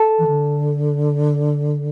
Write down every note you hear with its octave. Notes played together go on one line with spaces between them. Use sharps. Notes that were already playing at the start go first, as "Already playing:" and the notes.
Already playing: A4
E3
D3